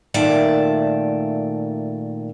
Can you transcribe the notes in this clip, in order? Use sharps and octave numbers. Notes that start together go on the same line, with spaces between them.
A#2 D#3 A3 D5 E5 A5